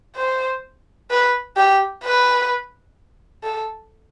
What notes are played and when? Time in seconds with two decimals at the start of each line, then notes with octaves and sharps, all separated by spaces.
0.16 C5
1.11 B4
1.57 G4
2.04 B4
3.44 A4